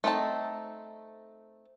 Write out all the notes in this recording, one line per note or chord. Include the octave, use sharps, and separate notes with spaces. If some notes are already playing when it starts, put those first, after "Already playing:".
A3 C4 D#4 F4 A5